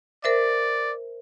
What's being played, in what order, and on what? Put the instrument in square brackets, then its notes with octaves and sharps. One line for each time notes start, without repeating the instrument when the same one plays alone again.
[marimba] A#4 C5 E5 [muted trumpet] D5